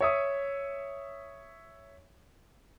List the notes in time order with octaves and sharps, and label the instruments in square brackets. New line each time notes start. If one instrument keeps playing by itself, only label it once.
[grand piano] C#5 E5 D#6